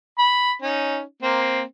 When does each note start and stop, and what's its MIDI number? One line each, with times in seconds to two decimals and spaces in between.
0.19 0.53 83
0.62 1.01 61
0.62 1.01 63
1.22 1.62 58
1.22 1.62 60